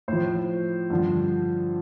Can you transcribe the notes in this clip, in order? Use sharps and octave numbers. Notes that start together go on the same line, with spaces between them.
A2 F3 C5
G2 D3 F3